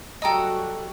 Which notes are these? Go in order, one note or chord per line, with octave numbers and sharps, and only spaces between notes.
F#3 G3 F#4 A4 D#5 G5 A#5 D#6